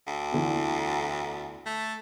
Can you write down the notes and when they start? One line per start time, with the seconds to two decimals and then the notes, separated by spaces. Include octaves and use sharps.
0.07 D2
0.32 E2 D3 E3
1.66 A3